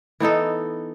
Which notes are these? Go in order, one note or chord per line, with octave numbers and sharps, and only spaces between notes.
E3 B3 D#4 A4